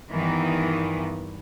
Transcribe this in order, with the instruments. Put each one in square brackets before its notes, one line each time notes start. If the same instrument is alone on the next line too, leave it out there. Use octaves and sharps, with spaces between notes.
[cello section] G2 D#3 E3 B3